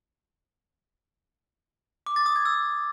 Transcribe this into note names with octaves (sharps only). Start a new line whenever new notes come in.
D6
A6
D#6
G#6
E6